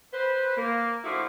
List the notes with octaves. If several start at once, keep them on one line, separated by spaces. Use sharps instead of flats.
B4 C5
A#3
D3 F3 A3 A#3 E4 F#4